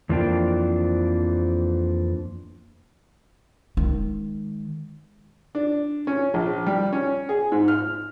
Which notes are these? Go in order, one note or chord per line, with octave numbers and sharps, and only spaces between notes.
F2 E3 F3 A#3 D4 G5
D#3 G#3
D4
C#4
A#1
G3
C#4
G#4
G#2
F6